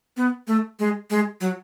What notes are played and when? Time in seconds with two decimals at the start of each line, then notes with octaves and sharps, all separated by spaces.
0.17 B3
0.47 A3
0.79 G#3
1.10 G#3
1.41 F#3